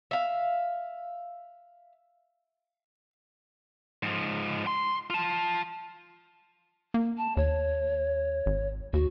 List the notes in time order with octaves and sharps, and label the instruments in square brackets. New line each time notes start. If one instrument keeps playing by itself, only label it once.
[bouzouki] E5 F5
[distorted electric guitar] G#2 F3
C6
F4 A5
[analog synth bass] A#3
[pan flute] A5
[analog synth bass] D#2 [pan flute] C#5
[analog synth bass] G#1
[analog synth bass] D#2 [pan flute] F#4